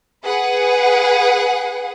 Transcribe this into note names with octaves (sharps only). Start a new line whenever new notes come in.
G#4 B4 F#5